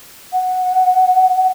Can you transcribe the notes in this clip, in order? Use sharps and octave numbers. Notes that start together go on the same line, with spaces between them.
F#5